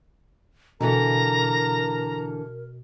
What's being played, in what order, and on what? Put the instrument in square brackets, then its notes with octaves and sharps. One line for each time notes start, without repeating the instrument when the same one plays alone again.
[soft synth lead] B2 [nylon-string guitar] D3 E3 B3 [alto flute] A#4 [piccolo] A#5